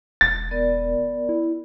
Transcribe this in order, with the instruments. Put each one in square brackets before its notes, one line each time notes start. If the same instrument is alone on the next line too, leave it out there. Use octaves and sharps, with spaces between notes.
[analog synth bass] E1 [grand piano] A6
[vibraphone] B3 A#4 D5
[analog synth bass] E4